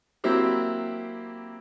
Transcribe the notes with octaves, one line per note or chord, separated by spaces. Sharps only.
F#3 A#3 C4 E4 G4